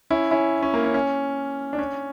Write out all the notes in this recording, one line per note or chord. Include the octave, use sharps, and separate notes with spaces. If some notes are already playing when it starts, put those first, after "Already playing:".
C#4 E4
C#4 E4
C#4
A#3
C#4
C#4
D4
C#4